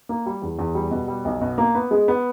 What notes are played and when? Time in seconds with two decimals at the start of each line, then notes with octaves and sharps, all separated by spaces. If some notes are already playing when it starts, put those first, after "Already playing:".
0.09 A#3
0.26 G3
0.42 E2
0.59 E2
0.75 G3
0.91 B2
1.08 G3
1.25 B1
1.41 B2
1.58 A#3
1.75 B3
1.91 G#3
2.08 B3